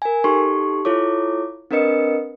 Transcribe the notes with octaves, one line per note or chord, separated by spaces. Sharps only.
A#4 G#5
D#4 G4 A4 C6 C#6
E4 F4 A4 C#5 D6
C4 D4 A#4 B4 D#5 C#7